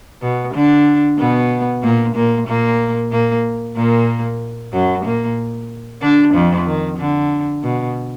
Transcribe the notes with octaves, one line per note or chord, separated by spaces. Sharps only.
B2 B3
D3 D4
B2 B3
A#2 A#3
A#2 A#3
A#2 A#3
A#2 A#3
A#2 A#3
F#2 F#3
A#2 A#3
D3 D4
F2 F3
D#3
D3
B2